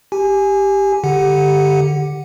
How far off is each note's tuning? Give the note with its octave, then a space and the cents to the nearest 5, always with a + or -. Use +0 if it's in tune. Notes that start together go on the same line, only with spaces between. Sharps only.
G4 +0 G#5 +0
D3 +0 G4 +0 F#5 +0